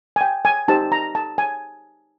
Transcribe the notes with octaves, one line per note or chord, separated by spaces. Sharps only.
G#5
G5
G#5
D#4 G4 C5 A5
A#5
A5
G#5